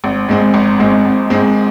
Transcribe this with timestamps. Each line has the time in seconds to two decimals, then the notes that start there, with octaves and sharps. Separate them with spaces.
0.04 G#1
0.29 G#2 G#3 C4
0.54 G#1
0.79 G#2 G#3 C4
1.05 G#1
1.30 G#2 G#3 C4